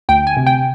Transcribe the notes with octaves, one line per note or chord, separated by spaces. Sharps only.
D2 G5
G#5
C3
G5